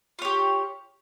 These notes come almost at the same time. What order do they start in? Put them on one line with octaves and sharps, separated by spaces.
F4 C#5 G4